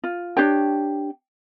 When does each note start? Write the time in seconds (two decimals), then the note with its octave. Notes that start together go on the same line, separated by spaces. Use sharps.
0.04 F4
0.37 D4 G4 C#5 G5